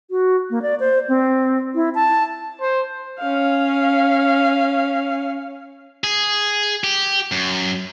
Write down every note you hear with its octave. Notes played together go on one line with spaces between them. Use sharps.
F#4
A#3
D5
C5
C4
E4
A5
C5
C#4 F5
G#4
G4
F#2